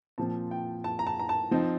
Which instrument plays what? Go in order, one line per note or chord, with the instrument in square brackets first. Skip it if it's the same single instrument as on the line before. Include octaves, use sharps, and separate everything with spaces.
[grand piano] A#2 F3 C4 A5
G5
A5
A#5
A5
A#5
A5
F3 C4 D#4